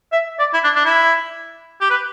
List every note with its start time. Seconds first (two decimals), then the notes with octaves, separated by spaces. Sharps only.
0.12 E5
0.39 D5
0.53 E4
0.64 D4
0.76 D4
0.85 E4
1.81 G4
1.90 B4